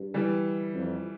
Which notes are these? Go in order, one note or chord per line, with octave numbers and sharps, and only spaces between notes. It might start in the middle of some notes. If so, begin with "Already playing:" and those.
Already playing: G2
E3 G3
F2